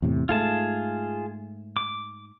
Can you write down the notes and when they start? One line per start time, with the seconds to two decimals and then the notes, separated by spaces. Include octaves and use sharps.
0.02 E2 A2 C3
0.29 G#2 A3 F4 G#4 A5
1.77 D6